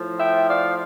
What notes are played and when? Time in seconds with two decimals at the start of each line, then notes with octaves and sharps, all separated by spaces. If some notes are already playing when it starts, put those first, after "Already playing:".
Already playing: A2 F3
0.20 E5 G5
0.49 D5 F5